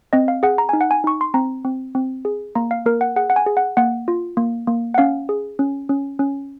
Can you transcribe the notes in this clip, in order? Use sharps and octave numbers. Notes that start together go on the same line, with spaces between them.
C4 D#5
F5
G#4 F#5
A#5
D#4 G#5
F#5
G#5
D#4 C#6
C6
C4 A#5
C4
C4
G#4
A#3 A#5
F5
A#3 A#4
F#5
G#4 F#5
F#5
G#5
G#4
F#5
A#3 F#5
F4
A#3
A#3
F#5
C#4 F5
G#4
C#4
C#4
C#4